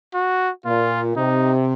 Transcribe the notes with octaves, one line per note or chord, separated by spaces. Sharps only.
F#4
A#2 F4
C3 D#4